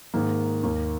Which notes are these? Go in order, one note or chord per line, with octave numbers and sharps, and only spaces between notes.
G#2 D#3 A#3
D#2 D#3 A#3